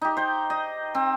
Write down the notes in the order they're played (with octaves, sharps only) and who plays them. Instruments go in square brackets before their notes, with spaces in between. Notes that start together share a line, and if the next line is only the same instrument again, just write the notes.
[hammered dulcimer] D#4 G4
C5 G5
D#5
C4